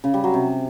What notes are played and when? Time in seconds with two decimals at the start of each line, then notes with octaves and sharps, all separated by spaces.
0.04 C#3
0.14 G3
0.24 F#3
0.34 C3